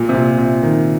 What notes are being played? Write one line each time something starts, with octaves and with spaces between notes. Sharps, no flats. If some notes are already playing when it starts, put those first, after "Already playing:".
Already playing: A#2
C3
A#2
C3
D#3